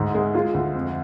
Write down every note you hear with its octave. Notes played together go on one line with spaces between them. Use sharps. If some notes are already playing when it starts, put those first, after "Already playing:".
Already playing: D2 G#2
G#3
G#3 F4 G#4
D2
F2